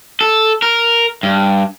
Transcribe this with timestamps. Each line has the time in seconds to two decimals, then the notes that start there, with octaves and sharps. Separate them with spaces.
0.21 A4
0.62 A#4
1.23 G2